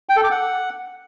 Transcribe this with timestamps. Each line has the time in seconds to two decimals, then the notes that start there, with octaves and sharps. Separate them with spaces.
0.09 G5
0.17 A4
0.24 D6
0.31 F#5